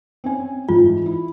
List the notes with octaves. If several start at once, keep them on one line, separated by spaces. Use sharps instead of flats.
C4 C#4 G#5
G#2 E3 F4
E4